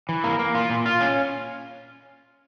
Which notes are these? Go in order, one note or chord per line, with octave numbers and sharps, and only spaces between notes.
E3
A#3
A#3
F4
A#2
F4
C#4